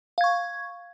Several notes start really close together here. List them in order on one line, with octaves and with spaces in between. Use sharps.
F5 G#6 C#6